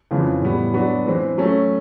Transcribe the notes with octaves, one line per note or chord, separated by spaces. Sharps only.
F2 C#3 E3 G#3
A2 E3 G3 B3
F#3 B3 D4 F#4
E3 G#3 C4
F#3 A3 C#4